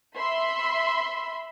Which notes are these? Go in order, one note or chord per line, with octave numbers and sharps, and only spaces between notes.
E5 B5 C6